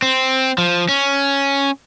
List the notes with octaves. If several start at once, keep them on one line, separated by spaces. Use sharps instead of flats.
C4
F3
C#4